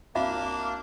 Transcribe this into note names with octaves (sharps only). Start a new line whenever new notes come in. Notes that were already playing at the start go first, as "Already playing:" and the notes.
C2 A#3 D4 F#4 E5 F5 B5